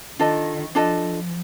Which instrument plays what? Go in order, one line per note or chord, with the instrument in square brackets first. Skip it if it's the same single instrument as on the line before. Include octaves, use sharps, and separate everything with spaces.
[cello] D#3 [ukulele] D4 F4 A4 D#5
[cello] F3 [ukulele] D4 F4 A4 D#5